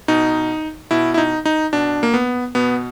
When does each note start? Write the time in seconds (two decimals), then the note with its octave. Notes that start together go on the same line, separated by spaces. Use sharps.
0.08 B2 D#4
0.91 B2 E4
1.14 E4
1.18 D#4
1.45 D#4
1.73 B2 D4
2.03 A#3
2.14 B3
2.55 B2 B3